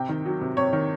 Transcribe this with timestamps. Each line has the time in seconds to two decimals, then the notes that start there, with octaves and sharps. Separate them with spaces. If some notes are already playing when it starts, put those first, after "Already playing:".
Already playing: C3 G5
0.09 D#3
0.26 F#3
0.41 C3
0.57 C3 C#5
0.73 D#3